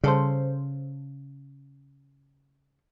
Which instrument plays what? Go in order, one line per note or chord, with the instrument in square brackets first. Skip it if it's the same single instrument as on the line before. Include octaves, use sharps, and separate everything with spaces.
[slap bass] C#3 [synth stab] G3 A4 C5